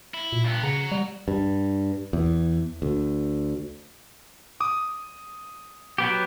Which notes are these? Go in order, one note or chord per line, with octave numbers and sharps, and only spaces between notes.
E4
A#2
G2 B3
C#3 F#5 A#5
G3
G2
E2
D2
D6 D#6
F#3 B3 G4